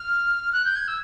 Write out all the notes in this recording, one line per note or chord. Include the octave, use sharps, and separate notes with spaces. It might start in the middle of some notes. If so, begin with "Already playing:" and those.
Already playing: F6
F#6
G6
G#6
E6